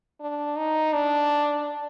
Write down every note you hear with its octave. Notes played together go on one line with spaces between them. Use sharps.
D4
D#4
D4